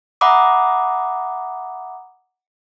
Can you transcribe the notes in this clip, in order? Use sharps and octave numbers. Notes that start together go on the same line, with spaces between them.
E5 F#5 A#5 B5 D6 D#6